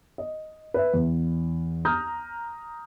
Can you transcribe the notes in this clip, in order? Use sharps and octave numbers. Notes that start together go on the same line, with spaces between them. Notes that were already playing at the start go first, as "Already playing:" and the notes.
D#5
B4 E5
E2
A#5 D#6 F6 G6